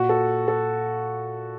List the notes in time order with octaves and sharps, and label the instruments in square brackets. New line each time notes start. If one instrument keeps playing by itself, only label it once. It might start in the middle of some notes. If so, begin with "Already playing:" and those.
Already playing: [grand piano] A#2 F#4
A4
A4